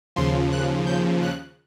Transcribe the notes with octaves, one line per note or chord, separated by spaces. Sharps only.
D#2 C#3 F3 C6
F#6
G6
F#6